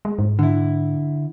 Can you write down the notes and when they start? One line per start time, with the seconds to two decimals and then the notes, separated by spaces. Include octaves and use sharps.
0.05 G#3
0.19 G#2
0.39 D3 E4